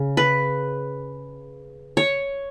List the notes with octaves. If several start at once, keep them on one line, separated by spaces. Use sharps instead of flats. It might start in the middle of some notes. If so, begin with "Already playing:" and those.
Already playing: C#3
B4
C#5